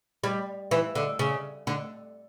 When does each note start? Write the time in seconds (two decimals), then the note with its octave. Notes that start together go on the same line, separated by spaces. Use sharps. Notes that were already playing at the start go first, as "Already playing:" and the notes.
0.24 G3
0.71 E3
0.95 D3
1.19 C#3
1.67 D3